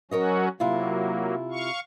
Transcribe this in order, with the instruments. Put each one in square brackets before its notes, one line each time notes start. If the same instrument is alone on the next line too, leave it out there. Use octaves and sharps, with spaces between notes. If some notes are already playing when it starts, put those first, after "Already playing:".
[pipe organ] F#3 C#4 F#4 [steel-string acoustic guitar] A#4 C#5 D#5
[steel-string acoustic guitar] C3 E4 F4 [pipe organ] F#3 A#3
[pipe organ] F5 C#6